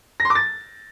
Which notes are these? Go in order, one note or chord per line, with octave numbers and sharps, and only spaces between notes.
A#6
C6
D6
A6